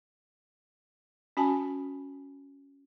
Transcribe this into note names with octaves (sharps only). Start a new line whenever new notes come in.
C#4 F#4 G#5 A5